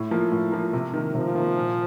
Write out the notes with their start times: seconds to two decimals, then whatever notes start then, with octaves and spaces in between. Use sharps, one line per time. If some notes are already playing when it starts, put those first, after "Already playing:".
Already playing: A2
0.11 F3 A#3
0.32 A2
0.52 F3 A#3
0.73 C3
0.93 D#3 A#3
1.14 C3 F3
1.35 D#3 A#3
1.56 A#2